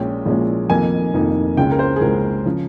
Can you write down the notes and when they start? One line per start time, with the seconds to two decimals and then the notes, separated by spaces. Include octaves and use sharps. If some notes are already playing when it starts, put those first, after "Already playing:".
Already playing: A#1 A#2 F3 G#3 C#4 G5
0.26 A#1 A#2 F3 G#3 C#4
0.69 F1 F2 D#3 A#3 D#4 G#5
1.13 F1 F2 D#3 A#3 D#4
1.57 C#2 C#3 G#3 G5
1.72 A#4
1.79 C5
1.96 G#4
2.01 C#2 C#3 G#3 A#4
2.45 C#3 F3